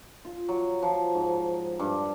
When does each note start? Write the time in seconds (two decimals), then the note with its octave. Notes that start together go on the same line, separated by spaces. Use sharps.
0.25 F4
0.49 F#3
0.82 F3
1.14 G#2
1.79 G2